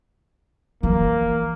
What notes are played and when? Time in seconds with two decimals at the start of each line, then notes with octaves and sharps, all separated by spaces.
0.83 E3 F3 A#3